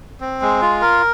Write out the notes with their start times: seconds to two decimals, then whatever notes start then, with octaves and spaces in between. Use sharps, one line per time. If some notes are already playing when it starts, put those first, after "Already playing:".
0.20 C4
0.42 G#3
0.62 F4
0.82 A#4